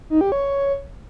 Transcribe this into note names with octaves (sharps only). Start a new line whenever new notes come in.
D#4
G4
C#5